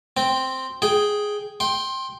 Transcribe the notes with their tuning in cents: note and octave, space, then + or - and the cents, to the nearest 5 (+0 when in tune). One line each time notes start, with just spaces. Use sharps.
C4 +0 G5 +0
G#4 +0 G5 +0
G5 +0 C6 +20